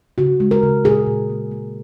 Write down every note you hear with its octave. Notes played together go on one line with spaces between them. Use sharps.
C#3 F#4
G#3
A#4
C#3
A#2 G#4
A#2
A#3
A#3